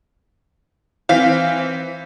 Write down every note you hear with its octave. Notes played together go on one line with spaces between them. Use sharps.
E3 C4 F5 B6